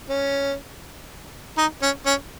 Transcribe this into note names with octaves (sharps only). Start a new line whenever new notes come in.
C#4
D#4
C#4
C#4